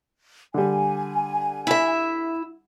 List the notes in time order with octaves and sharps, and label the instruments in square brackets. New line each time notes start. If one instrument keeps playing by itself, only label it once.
[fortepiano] D3 G3 [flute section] G#5
[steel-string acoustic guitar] E4 E5